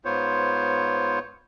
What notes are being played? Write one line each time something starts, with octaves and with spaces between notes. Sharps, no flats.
G#2 B3 F4 C5 C#5